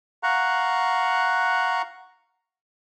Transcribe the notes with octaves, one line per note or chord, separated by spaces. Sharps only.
F5 F#5 A#5 C#6 F#6